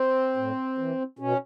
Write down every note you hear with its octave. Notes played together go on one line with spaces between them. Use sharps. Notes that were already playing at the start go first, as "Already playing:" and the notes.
Already playing: C4
A2
E3
B2 C#4